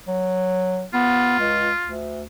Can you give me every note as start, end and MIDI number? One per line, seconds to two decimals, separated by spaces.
0.08 0.84 54
0.94 1.37 59
0.94 1.95 65
1.39 1.69 37
1.84 2.24 38